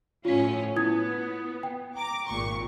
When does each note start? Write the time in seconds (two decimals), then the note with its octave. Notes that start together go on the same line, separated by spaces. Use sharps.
0.25 A2 F3 C#4 F4 B6
0.76 B3 E4 D#6 G#6
1.63 G5
1.96 A#5 D6
2.27 G#1 A#2 C#6